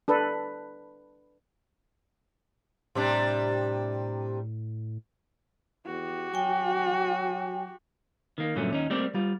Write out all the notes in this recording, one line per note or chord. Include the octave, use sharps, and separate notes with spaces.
D4 A4 B4
A2 C3 G3 D4
E2 F#4 G4
F#3 G5 G#5
D#3 A#3
G2 A#2 D3 F#3 A3 C#4
D#2 C#4 D#4
G3 A3 A#3 C4 G4 D5
G3 F4